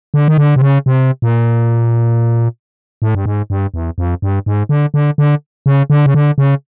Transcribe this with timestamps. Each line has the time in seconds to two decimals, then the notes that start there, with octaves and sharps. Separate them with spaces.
0.14 D3
0.28 D#3
0.38 D3
0.56 C3
0.62 C#3
0.86 C3
1.22 A#2
3.02 A2
3.15 G2
3.25 G#2
3.50 G2
3.74 E2
3.98 F2
4.22 G2
4.46 G#2
4.69 D3
4.94 D3
5.18 D3
5.66 C#3
5.90 D3
6.06 C#3
6.14 D3
6.38 C#3